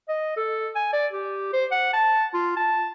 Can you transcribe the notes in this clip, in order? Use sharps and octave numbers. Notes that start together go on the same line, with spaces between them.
D#5
A4
G#5
D5
G4
C5
F#5
A5
F4
A5